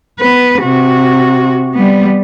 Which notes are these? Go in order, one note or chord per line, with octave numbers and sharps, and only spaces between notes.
B3 B4
C3 F#4
G3 B3